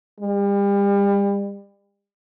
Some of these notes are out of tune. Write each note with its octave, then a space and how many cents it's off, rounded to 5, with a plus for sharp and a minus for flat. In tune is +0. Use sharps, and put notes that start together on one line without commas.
G3 +35